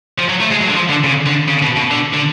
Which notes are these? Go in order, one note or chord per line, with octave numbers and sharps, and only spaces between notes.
F3
F#3
A3
G#3
F#3
D3
F3
D3
C#3
D3
C#3
B2
B2
D3
D3